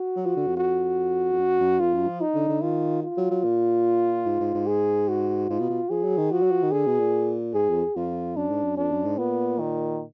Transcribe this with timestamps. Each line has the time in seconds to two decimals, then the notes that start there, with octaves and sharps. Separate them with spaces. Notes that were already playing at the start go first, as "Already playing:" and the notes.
Already playing: F#4
0.16 F#3
0.26 F3
0.37 D3
0.47 F2
0.57 F#4
1.33 F2
1.39 F#2
1.60 F#2
1.80 F2 F4
1.94 F#2
2.08 F3
2.21 D#4
2.35 D3
2.49 D3
2.62 D#3 F4
3.03 F4
3.17 F#3
3.31 F#3
3.44 A#2
4.26 G#2
4.40 G#2
4.54 G#2
4.67 G#4
5.09 F#4
5.50 G#2 F4
5.60 B2
5.70 B2
5.90 F3 G#4
6.04 F#3
6.18 D#3
6.32 F3 F#4
6.42 F#3
6.52 F3
6.62 D#3
6.72 D3 G#4
6.86 B2
7.00 A#2
7.54 G#2 G#4
7.69 F2
7.96 F2 F4
8.36 F#2 D4
8.50 G#2
8.64 F#2
8.78 F2 D4
8.92 F#2
9.05 G#2
9.18 A#2 B3
9.60 D#3